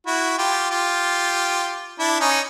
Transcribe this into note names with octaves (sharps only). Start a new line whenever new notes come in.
E4 F#4
F4 G4
F4 G4
D4 E4
C#4 D#4